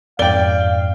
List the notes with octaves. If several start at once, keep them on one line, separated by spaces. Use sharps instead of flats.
F2 G#2 D5 F5 G5 G7